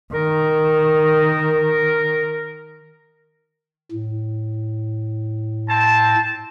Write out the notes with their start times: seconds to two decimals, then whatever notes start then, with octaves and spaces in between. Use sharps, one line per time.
0.14 D#3 A#4
3.92 A2
5.69 C4 A5